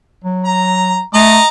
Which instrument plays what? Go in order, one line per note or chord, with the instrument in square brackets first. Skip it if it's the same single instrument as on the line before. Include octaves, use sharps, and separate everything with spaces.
[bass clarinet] F#3
[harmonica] A#5
[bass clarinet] A3 [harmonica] D#5 A#5 D6